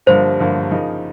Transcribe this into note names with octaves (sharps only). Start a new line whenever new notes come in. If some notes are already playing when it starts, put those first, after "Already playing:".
G1 G2 D3 F3 A#3 C5
G1 G2 D3 F3 A#3
C#3 F3 A#3 D#4